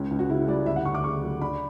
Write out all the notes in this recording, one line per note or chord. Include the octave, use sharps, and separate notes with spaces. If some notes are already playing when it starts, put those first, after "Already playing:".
Already playing: C#2 C#4
C#2
F#4
C#3 E4
G3 D5
D2 E5
F#5
D2 C#6
D6
C#3 C#6
F#3
D4 B5